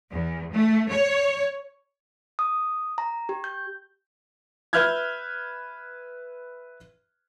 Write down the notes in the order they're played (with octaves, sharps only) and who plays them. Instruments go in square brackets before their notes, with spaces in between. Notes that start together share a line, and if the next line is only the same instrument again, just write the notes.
[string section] E2
A3
C#5
[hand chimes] D#6
A#5
G4
G6
[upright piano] B4 E5 F6 G6 G#6